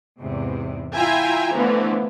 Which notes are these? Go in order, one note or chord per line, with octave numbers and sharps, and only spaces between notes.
E2 G#2 C3
E4 F4 E5 G5 G#5 A#5
D3 E3 F3 A3 B3